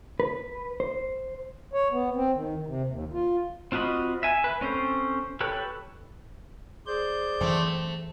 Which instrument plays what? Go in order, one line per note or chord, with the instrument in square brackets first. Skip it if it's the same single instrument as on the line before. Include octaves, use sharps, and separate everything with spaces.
[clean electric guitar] B4
C5
[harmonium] C#5
B3
C4
D#3
C3
D#2
F4
[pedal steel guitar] C4 F4 F#4 D#5 B5
E5 G#5
B4
C4 C#4 A4 C5
G4 A4 B4 C#5
[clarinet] G#4 [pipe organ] C5 D5 G6
[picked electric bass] F#2 E3 F#3 [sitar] A3 C4